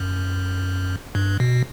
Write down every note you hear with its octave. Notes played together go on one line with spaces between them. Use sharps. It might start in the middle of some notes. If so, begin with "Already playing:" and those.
Already playing: F#2
G2
B2